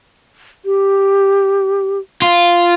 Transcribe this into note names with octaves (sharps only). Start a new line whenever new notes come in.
G4
F4